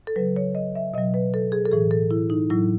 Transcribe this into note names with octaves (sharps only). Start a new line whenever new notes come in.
A4
C#3 F#3 B4
C#5
D#5
E5
B2 F#3 D#5
B4
A4
G#4
A4
A2 E3 G#4
A4
E4
D#4
A2 F#3 E4